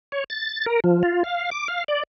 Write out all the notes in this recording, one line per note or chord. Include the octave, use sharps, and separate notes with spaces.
C#5
A6
A#4
F3
F4
F5
D6
F5
D5